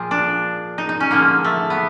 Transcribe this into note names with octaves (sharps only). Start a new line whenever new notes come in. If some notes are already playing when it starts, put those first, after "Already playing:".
Already playing: A#2 F3 G#3
D4
D#4
D#4
C#4
D3 F3 G#3 A#3
A3
B3